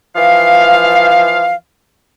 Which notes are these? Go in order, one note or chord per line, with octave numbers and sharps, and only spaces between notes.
E3 F3 F5